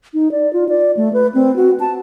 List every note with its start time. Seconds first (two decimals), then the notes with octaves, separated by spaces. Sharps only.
0.14 D#4
0.32 D5
0.53 F4
0.69 D5
0.97 A3
1.14 B4
1.35 C4
1.56 F#4
1.80 A5